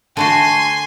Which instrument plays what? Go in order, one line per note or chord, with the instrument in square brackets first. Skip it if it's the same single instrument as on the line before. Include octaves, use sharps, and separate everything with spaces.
[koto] D3 A3 F#4 [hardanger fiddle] G#5 C6